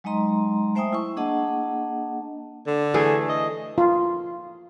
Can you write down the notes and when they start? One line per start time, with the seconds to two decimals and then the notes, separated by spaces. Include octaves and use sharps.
0.04 F#3 G#3 D#4 D#5 A#5 C6
0.75 A3 C5 E5 G5 G#5 D#6
0.93 E4 C#6
1.17 A#3 D4 G#4 D#5 F#5 A5
2.67 D3
2.94 E3 A3 G#4
3.29 D#5
3.78 F4